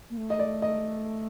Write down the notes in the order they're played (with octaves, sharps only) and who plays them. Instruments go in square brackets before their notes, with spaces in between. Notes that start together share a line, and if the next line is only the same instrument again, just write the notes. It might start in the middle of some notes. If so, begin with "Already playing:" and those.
[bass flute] A#3
A3
[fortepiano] D#5
D5
D#5